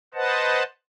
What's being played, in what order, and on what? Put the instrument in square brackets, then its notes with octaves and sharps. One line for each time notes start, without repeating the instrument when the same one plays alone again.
[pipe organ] B4 C5 D#5 F#5 A5